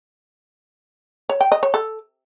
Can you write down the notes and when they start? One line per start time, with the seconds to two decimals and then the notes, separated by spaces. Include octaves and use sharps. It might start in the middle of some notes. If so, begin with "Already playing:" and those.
1.29 C#5
1.41 G5
1.52 D#5
1.63 C#5
1.74 A4